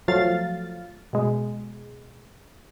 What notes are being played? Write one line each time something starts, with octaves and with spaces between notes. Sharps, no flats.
F3 F#3 A3 F5 A6
B2 G#3